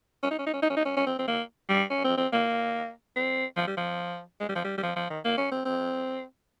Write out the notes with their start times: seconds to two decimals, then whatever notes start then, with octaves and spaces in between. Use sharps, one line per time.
0.23 C#4
0.31 D#4
0.39 C#4
0.47 D#4
0.54 C#4
0.63 D#4
0.70 C#4
0.77 D#4
0.85 C#4
0.97 C#4
1.07 C4
1.19 C4
1.28 A#3
1.69 G3
1.90 C#4
2.04 C4
2.18 C4
2.33 A#3
3.16 C4
3.57 F3
3.67 G3
3.77 F3
4.40 G#3
4.49 G3
4.56 F3
4.64 G3
4.78 G3
4.83 F3
4.96 F3
5.10 D#3
5.25 A#3
5.38 C#4
5.52 C4
5.65 C4